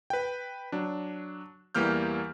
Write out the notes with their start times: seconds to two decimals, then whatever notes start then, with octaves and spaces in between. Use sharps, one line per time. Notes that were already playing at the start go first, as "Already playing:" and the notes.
0.10 B4 G5
0.72 F#3 D4
1.75 E2 E3 G3 A#3 F6 G6